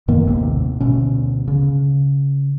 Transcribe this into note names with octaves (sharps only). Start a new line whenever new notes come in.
F#2 D#3 A#3 B3
A1 D#2 G#2 C3
D2 B2 C#4
C#3